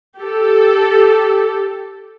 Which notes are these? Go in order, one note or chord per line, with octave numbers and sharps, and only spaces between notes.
G4 A4